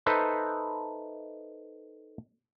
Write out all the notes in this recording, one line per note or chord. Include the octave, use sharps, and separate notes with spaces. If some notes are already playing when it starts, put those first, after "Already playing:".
D#4 A4 B4 C5 E5